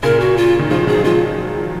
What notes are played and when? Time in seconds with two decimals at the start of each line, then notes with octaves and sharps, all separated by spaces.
0.03 A#2 C#3 A#4
0.20 F#4
0.37 F4
0.59 D#3
0.70 C#3 F3 F4
0.87 D#3 F#3 G#4
1.04 F3 G#3 F4